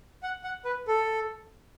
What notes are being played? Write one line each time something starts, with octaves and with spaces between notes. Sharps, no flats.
F#5
F#5
B4
A4